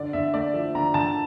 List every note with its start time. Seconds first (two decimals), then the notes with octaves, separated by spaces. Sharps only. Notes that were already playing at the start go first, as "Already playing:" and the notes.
Already playing: D3 D5
0.13 D3 E5
0.34 A3 D5
0.54 F3 E5
0.75 D3 A#5
0.94 D3 A5